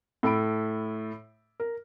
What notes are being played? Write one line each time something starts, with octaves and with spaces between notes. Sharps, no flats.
A2 A4 B5 D7
A#4